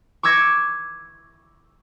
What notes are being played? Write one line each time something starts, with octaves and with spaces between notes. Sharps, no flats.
C#6 D6 E6 G#6 A#6 C#7